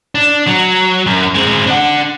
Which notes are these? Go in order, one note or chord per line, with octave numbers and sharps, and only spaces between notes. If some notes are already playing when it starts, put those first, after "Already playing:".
D4
F#3
F#2
G#3 C4
D4 F#5